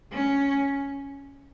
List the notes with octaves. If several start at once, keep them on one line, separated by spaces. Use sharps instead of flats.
C#4